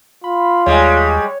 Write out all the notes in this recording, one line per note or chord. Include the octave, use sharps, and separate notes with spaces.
F4 B5
D#2 G3 G#3 C#5